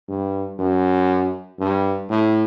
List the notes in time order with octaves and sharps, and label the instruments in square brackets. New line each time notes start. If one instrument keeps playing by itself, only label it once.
[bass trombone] G2
F#2
G2
A2